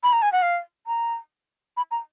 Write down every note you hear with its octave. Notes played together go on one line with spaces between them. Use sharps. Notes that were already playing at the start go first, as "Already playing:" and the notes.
B5
A#5
G#5
F#5
F5
A#5
B5
A#5